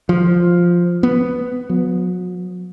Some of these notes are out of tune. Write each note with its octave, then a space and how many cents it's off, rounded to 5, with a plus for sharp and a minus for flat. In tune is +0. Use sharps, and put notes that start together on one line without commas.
F3 +0
B3 +5
F#3 -35